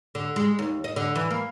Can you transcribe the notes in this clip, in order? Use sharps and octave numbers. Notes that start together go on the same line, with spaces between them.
D3
G#3
D#2
D#5
D3
E3
A#3